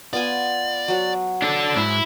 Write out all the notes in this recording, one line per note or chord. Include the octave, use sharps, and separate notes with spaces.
B3 F4 D5 G#5
F#3 F#5
D4 A4
G#2 E4